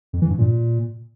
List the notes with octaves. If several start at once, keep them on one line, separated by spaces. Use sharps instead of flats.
F2
E3
G2
A#2